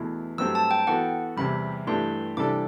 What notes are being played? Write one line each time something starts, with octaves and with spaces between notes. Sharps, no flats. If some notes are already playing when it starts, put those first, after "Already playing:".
Already playing: E2 B2 A3 E4
G2 F#3 A3 C4 G4 E6
A5
G5
E3 B3 F#4 A4 F#5
E2 C3 G3 B5
G2 E3 A3 D4 G4 C6
C3 E3 G3 D4 A4 D6